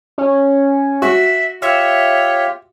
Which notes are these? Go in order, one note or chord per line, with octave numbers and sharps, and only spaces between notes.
C#4
F#4 E5
F4 G4 C#5 E5